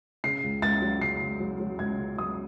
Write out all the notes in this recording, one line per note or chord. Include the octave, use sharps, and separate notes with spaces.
C#3 C7
C#2
C#2 A6
F#3
C#3 C7
C#2
F#3
F#3
C#2 G#6
C#3
F#3 D#6